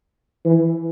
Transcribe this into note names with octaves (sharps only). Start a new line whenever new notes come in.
E3